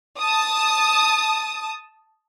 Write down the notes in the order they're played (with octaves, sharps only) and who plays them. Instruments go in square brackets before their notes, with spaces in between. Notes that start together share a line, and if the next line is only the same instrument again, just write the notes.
[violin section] A5 D#6